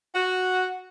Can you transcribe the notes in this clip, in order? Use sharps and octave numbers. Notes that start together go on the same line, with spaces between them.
F#4